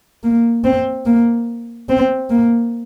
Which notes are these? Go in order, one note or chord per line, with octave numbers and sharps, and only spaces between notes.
A#3
C4
A#3
C4
A#3